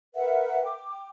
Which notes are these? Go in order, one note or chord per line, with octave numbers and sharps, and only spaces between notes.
A#4 B4 E5 F#5
G5 D6